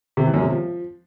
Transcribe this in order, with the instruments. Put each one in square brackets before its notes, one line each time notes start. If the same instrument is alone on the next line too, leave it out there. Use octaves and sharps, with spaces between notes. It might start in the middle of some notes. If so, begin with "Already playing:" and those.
[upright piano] C3
E3
F#2
C3
F3